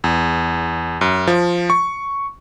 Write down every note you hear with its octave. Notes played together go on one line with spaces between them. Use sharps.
E2
F#2
F3
C#6